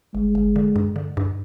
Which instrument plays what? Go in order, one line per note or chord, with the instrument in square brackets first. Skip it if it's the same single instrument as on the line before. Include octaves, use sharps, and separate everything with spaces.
[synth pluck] G1 [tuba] G#3
[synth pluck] G1
D3
G2
D3
G2